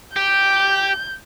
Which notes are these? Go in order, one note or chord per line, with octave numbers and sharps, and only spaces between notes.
G4 G6